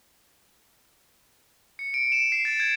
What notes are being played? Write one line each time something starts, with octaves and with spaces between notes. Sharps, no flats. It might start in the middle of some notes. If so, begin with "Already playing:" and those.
C#7
D7
E7
C7
A6
G#6